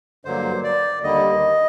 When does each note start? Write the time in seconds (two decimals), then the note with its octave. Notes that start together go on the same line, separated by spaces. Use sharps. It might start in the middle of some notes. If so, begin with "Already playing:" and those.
0.25 G2 D3 F#3 A#3 C5
0.64 D5
1.03 D#2 D3 G3 A#3 D#5